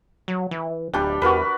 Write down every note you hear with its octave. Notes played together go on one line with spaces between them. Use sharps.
F#3
E3
D1 G3 D4 G5
E2 F#4 A#4 B4